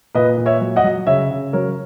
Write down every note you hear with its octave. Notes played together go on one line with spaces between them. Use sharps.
A#2 B4 D#5
A#2
C#5 E5
F#3
D#5 F#5
F#3
C#3 C#5 E5
C#3
F#3 A#4 C#5